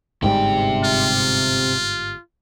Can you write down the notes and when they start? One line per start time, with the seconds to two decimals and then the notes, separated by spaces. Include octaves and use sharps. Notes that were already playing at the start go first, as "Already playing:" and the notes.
0.23 G1 G#2 C3 G3 G5
0.84 F4